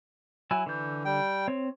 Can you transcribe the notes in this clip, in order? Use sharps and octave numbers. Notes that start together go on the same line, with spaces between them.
F#3 E4 G#5
D3 E3 G6
G3 G5
C4 C#5